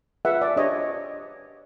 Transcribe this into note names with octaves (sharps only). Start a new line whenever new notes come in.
F4 G#4 B4 E5 F#5
D5
D4 G4 C5 C#5 D#5